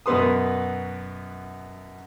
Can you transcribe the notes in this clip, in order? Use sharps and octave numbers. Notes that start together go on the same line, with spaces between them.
F#2 B2 B3 B4 C6 D#6